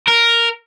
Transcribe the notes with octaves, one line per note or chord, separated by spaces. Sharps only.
A#4